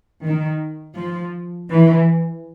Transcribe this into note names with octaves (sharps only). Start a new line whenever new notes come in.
D#3
F3
E3